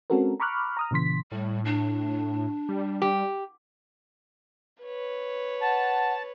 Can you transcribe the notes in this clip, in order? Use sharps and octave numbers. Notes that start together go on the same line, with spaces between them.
G#3 C4 C#4 F#4 A4 A#4
A#5 B5 C#6 D6 F6 F#6
A#5 D#6 F6
A#2 C#3 E3 C6 B6
A2 G3
D4
G3
G4
B4 C#5
F#5 A5